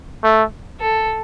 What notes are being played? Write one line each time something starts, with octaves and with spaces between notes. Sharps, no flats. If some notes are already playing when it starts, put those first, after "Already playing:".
A3
A4